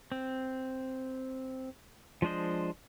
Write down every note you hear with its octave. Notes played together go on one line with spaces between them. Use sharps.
C4
F3 G#3 D4 C5 D#5